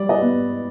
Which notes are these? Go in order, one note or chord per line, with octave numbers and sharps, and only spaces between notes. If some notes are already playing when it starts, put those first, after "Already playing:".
Already playing: G3 D5
D#5
B3